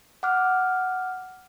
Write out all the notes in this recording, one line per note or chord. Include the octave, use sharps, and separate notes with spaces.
F#5 D6 F6